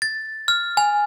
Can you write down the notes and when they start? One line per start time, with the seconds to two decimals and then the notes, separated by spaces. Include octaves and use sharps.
0.02 A6
0.48 F6
0.77 G#5